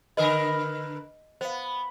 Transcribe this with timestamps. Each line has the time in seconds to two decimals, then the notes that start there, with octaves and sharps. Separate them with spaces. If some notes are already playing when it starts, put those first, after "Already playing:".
0.17 D3 A#4 B4 D#5
1.41 B3 C5 F5